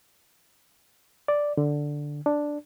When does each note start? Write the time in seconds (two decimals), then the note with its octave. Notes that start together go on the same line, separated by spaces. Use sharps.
1.28 D5
1.57 D3
2.26 D4